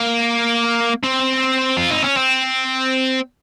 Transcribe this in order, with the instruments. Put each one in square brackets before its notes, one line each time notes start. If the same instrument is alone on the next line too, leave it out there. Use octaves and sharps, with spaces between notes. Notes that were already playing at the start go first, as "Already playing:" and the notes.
Already playing: [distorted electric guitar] A#3
C4
F4
D#4
C#4
C4